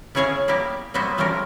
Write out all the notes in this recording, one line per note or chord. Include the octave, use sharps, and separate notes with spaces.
B3 C#4 E4 G#4 C#5 F5
G3 A#3 B3 E4 G4
F#3 G3 A#3 B3 C5 E5
F3 G3 A3 C#4 F4 A#4